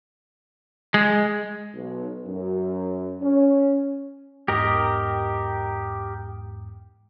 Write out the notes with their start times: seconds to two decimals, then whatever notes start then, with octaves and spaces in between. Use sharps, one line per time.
0.94 G#3
1.74 B1
2.26 F#2
3.21 C#4
4.48 E2 G#2 G4 A#4 D#5